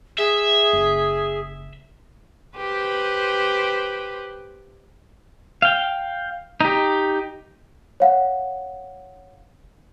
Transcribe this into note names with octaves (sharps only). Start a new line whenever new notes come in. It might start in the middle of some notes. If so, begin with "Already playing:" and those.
G#4 E5
F#1
G4 B4 C5
F5 G5
D#4 G4
C#5 F5 F#5